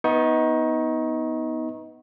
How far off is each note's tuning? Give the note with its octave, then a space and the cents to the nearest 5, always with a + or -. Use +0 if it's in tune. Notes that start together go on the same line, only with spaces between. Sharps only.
B3 +0 D#4 +25 C#6 -20